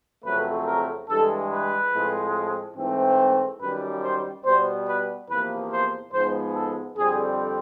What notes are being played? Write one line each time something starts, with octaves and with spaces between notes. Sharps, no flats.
F2 C#3 F#3 A3 C4 B4
A#4
G2 E3 G#3 A4
B4
A2 F3 G#3 C4
G#2 E3 A3 C4
F#2 D#3 G3 B4
C5
B2 G3 B3 C5
B4
E2 C3 F3 A#3 B4
C5
G#2 F3 G#3 B3 C5
A4
F2 D3 G3 C4 G#4